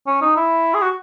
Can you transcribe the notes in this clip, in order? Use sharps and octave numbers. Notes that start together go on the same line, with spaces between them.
C#4
D#4
E4
G#4
F#4